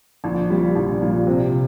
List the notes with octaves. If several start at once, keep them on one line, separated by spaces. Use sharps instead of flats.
A#1
A#2 G3
A#1
A#2 G3
C3